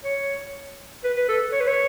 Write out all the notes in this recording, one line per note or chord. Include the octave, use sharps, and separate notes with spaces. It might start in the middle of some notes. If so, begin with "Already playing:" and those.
C#5
B4
B4
A4
C#5
B4
C#5